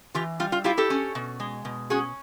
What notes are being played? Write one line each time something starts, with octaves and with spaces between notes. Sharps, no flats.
E3 F4 G4
G3 F4
F4
E4 F4 G4
G4 A4
C#4
B2
G#3
B2
C#4 F#4 G#4